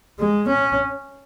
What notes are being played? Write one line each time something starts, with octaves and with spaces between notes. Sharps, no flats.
G#3
C#4